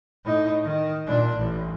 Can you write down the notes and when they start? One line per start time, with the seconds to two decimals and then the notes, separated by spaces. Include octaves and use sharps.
0.24 A2 D#4
0.64 D#3
1.07 A#2 D4
1.37 A1